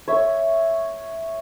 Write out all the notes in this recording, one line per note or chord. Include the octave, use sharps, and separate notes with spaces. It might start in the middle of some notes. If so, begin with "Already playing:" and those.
C#5 E5